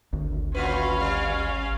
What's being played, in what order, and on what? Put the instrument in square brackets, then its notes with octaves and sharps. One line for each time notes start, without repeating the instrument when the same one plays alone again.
[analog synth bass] G#1 [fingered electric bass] D2
[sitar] A2 F#4 B4 [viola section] C#4 F5
[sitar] G3